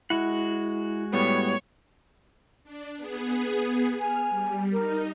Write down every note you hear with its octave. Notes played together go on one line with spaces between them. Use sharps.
G#3 E4 F#4 F#5
A2 G3 B3 C#5
D4
B3 G#4
G#5 F6
G3
D#4 A#4